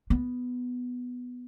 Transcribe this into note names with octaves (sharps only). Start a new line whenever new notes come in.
B3